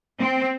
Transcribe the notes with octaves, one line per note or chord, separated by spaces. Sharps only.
C4